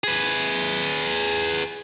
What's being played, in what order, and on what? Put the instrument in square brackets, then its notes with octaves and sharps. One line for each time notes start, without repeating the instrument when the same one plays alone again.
[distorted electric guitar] G#4 B4